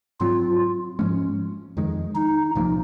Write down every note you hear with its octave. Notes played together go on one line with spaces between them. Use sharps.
G#2 F#3 C4 F4
G#2 F3 G#3 C#4
F2 D#3 G#3
D#4
C2 A#2 F3 A#3